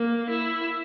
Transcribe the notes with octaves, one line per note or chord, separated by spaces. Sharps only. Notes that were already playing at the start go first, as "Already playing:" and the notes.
Already playing: A#3
E4